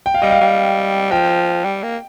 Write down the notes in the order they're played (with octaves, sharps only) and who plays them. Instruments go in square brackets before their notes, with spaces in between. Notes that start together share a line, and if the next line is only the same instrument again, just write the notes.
[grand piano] G5
F5
[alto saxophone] G3 [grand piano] D#5
[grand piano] F5
[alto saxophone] G3
[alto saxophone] F3 [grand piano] G5
[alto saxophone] G3
A#3